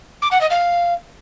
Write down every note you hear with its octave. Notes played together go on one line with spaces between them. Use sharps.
D6
F#5
D#5
F5